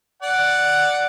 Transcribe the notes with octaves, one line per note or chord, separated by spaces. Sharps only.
D5 F#5